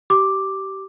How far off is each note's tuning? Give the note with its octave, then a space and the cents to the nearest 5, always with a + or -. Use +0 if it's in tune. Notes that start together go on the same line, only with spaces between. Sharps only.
G4 -25 D6 +0